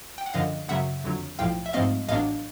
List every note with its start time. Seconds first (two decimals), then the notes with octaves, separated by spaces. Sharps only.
0.18 G5
0.26 F#5
0.34 F#2 D3 F3 D#5 F5
0.68 F#2 C#3 F#3 E5 F#5
1.04 F2 D3 F#3
1.39 B1 A2 F3 F5 G5
1.66 E5
1.73 G#2 F3 A3 C4 D#5 F5
2.08 A1 A2 F#3 B3 D4 D#5 F5